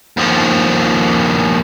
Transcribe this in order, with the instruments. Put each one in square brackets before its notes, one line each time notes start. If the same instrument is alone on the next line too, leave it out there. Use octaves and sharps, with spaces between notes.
[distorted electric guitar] D#2 F3